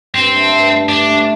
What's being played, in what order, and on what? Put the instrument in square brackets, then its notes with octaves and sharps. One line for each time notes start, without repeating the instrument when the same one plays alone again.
[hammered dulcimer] G2 [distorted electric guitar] C4
[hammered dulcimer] D3 A3
G2
D3 A3
[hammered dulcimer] G2 [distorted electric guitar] D4
[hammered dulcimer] D3 A3